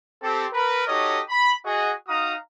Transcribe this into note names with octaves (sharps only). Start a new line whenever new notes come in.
C4 G4 A4
A#4 B4
D#4 F#4 G4 A4 C#5 D#5
B5
F#4 G#4 D#5
D#4 F#4 F5 A#5 D#6